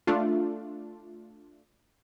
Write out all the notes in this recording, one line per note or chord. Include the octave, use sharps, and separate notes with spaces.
A3 D4 F4